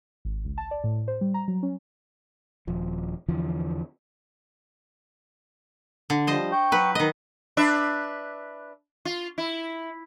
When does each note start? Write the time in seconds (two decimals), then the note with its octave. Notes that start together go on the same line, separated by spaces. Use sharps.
0.25 G#1
0.45 C#2
0.58 A5
0.71 D5
0.84 A2
1.08 C5
1.21 G3
1.34 A#5
1.48 F#3
1.63 C#4
2.67 D#1 F3
3.28 E2 D3 E3 F3
6.10 D3
6.27 F3 G3 C5 D#5
6.52 G5 C#6 G6
6.72 F#3 B4
6.95 D#3 D#5
7.57 D4 B4 E5
9.05 F4
9.38 E4